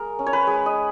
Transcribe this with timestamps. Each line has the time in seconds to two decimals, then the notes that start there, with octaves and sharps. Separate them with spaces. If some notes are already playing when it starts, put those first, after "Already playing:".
Already playing: G#3 A#4
0.19 C#4
0.27 C#5
0.33 B4
0.47 G#3
0.66 D#5